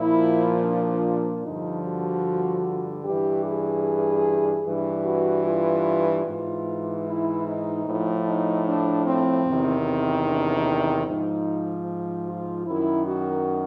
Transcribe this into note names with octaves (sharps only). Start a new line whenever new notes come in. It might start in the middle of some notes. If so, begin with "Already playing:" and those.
Already playing: A#2 F3 E4
D4
G2 D3 F3 D#4
F#4
G2 E3 G4
G#4
G2 E3
F#4
F4
G#2 E3 F4
E4
D#4
A2 F3
D#4
D4
C4
E2 C3 D#3
C4
D4
G#2 F3 D#4
F4
F#2 D#3 E4
F#4